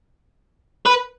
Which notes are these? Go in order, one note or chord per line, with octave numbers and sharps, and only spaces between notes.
B4